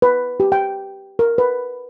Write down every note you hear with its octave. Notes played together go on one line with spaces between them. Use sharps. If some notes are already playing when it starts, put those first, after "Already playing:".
B4
G4
G5
A#4
B4